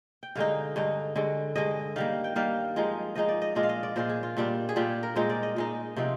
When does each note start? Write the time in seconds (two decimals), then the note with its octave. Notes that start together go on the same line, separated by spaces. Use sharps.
0.23 G5
0.35 G2 D3 G#3 D#4 F5
0.76 G2 D3 G#3 D#4
1.16 G2 D3 G#3
1.56 G2 D3 G#3 D#5
1.96 D#3 G3 A#3 F5
2.24 G5
2.36 D#3 G3 A#3 F5
2.76 F3 G#3 D#4
3.15 F3 G#3 D#4 D#5
3.29 D5
3.42 D#5
3.55 A#2 G#3 D4 F4 D#5
3.63 F5
3.69 D#5
3.83 D5
3.96 A#2 G#3 D4 F4 C5
4.09 G#4
4.23 F4
4.37 A#2 G3 D4 F4
4.69 G#4
4.76 A#2 G3 D4 F4 G4
5.03 A#4
5.16 A#2 G#3 D#4 C5
5.29 D5
5.43 D#5
5.56 A#2 G#3 D#4
5.96 C3 F3 C4 D#4